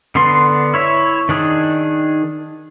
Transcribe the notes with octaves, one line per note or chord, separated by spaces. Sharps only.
D3 B3 D4 C6
E4 C#5 E5
D#3 D4 G#4